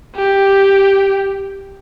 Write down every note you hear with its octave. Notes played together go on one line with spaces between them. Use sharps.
G4